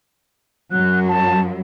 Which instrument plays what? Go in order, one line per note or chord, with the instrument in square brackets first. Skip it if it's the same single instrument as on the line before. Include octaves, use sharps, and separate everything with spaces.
[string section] F#2 F#3 [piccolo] F#6
[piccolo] A5